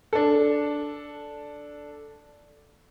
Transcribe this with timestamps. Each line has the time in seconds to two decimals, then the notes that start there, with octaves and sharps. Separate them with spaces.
0.13 D4 A4